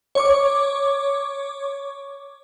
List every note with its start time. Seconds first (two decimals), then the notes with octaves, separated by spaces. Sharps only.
0.15 C#5 C#6 D6